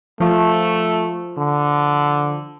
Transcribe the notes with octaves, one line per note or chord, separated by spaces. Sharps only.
F3 A3 F4
D3